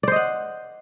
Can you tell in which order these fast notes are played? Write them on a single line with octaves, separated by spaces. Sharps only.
D5 C5 D#5 F#5